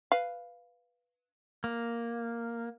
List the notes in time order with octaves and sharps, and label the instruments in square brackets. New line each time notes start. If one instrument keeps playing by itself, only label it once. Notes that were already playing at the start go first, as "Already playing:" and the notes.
[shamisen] B4 F5
[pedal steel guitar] A#3